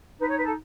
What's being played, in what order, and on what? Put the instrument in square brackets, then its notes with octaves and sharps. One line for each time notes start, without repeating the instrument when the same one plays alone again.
[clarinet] D#4 [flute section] B4
[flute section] C#5
B4
A4